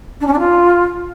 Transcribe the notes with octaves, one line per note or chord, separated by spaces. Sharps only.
D4
C#4
D4
F4